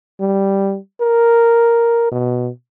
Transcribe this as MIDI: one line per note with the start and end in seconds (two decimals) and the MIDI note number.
0.20 0.78 55
1.01 2.11 70
2.11 2.50 47